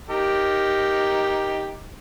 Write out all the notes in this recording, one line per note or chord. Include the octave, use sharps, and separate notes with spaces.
D#4 G4 A#4